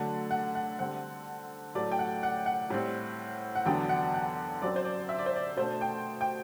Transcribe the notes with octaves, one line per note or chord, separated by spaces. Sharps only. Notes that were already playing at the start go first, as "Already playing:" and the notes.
Already playing: D3 F#3 A3 D4 F#5
F#5
F#5
D3 G3 C4 F#5
A2 F#3 A3 D5
G5
F#5
F#5
F#5
A2 G3 C4
F#5
E2 D3 F#3 B3 D4 G5
F#5
F#5
F#2 F#3 C4 D5
C5
D5
E5
D5
C5
D5
B2 A3 D4 C5
G5
G5